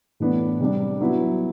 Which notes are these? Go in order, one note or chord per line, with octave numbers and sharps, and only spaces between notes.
A2 E3 B3 D4
C3 G3 D4
F#3 B3 E4